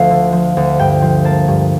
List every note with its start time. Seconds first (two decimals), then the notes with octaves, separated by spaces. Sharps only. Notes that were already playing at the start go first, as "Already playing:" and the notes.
Already playing: D2 F3 A3 F5
0.10 D3
0.33 F3
0.57 D2
0.79 G2 G5
1.02 F3
1.24 A#3 A5
1.48 G2